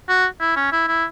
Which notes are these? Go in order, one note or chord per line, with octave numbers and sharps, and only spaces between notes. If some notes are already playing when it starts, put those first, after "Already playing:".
F#4
E4
C#4
E4
E4